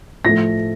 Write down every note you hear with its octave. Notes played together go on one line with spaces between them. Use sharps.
A2 F3 A3 A#6